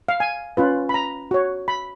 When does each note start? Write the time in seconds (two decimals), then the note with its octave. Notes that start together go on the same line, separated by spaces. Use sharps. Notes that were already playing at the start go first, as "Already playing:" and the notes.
0.09 F5
0.20 G#5
0.57 C#4 F4 B4
0.89 B5
0.94 A#5
1.31 F#4 C#5
1.68 B5